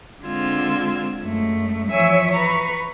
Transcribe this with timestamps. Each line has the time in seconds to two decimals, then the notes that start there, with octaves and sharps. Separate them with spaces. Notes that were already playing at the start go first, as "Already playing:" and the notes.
0.24 D3 G#3 C4 F4 E6 G#6
1.22 F#2 G#3 A3
1.91 E3 F3 C#5 E5 G#5 E6
2.31 B4 A#5 C#6